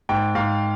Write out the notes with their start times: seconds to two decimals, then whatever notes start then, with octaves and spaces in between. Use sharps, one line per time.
0.09 G#2 G5
0.35 G#2 F5